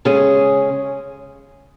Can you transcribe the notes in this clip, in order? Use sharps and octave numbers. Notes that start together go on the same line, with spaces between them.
C#3 G#3 C#4 G#4